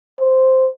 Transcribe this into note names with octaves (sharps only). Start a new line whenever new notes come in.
C5